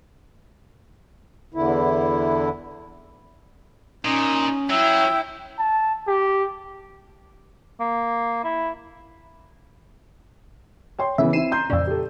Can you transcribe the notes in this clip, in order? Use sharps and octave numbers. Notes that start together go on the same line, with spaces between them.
E2 D3 E4
A#2 C#4 D#4
F#3 E4 E5 G5
A5
G4
A#3
E4
C#5 G5 C6
C#3 E3 B3 E5
C4 E4 C7 D#7 E7
A#5 C6 G6
F2 A#2 C#3 D5 E6
G4 A4